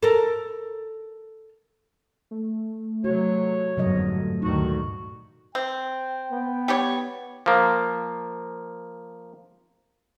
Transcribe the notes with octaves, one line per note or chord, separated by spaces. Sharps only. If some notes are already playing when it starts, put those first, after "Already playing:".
A4 A#4
A3
C3 F#3 F#4 C#5
G1 F2 G#2 C3 F#3 D#5
D2 G2 A#2 D#3 D#4 F#4
C4 G5
B3
G3 G4 C#5
F3 A#3